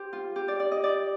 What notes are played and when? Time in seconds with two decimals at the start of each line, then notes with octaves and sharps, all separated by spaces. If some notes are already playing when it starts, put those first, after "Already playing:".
Already playing: G4 C5
0.13 F4
0.36 G4
0.48 D5
0.60 D5
0.72 D#5
0.84 D5